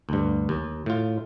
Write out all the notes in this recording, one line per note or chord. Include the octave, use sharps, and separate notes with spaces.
D2 G2
D#2
A2 F4